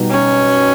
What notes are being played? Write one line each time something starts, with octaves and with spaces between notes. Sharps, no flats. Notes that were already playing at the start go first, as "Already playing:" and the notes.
Already playing: B2 G3 B3 D#4
C#4